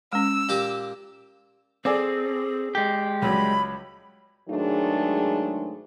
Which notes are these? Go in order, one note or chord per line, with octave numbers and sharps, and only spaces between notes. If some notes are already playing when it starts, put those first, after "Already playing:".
G#3 C#4 E6
A#2 G4 D6
C4 G#4 A4 D5 G#5
G#3 G4
C#2 F#3 G3 C#5 B5
G#2 D#3 F#3 G#3 A3 D4